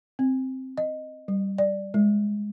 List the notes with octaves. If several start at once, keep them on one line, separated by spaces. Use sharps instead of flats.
C4
D#5
G3
D5
G#3